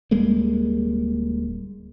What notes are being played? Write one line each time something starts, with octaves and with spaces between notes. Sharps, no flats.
D1 G3 G#3 A#3